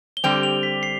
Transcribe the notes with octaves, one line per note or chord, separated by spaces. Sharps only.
G7
D3 G3 C4 G4 F7
F7
B6
C7